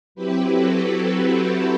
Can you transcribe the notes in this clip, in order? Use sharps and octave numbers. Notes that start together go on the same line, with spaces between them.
F#3 C4 E4 G4 B4
F#4 A4
F#4